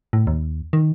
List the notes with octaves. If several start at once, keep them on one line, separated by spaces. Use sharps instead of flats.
A2
D#2
D#3